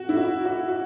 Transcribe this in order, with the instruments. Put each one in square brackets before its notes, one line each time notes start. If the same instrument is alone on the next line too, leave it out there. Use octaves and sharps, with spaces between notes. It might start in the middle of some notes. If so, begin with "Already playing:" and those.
Already playing: [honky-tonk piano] F#4
E4
F#4
F#4
F#4